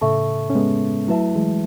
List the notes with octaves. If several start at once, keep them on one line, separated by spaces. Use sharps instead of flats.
A2 C#3 A4 E5 A5 C#6
C#4
G#3 B3
F#3 A3 E4 B4 E5 A5
E3 G#3